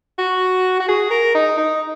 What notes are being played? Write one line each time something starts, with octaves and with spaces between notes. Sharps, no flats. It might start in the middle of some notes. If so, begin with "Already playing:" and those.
F#4
F#4
G#4
A#4
D#4
D#4